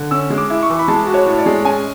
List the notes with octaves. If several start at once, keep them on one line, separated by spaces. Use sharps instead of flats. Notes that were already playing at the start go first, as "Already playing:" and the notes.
Already playing: D3
C#4 E6
G#3
D6
E4
C#6
E3
B5
G#3 A5
F#4
C#5
A2
D5
G#3
C#4 G#5